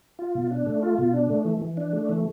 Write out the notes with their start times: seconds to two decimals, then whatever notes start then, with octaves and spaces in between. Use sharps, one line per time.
0.19 F4
0.35 B2
0.51 D4
0.66 A3
0.83 F4
0.98 B2
1.13 D4
1.30 A3
1.45 E3
1.62 E3
1.77 D4
1.93 A3
2.09 E3